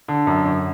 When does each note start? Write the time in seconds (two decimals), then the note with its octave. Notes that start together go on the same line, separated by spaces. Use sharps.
0.08 D3
0.27 F#2
0.45 F#2